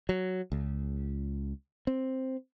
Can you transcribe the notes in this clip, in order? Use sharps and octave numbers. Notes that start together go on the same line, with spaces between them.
F#3
C#2
C4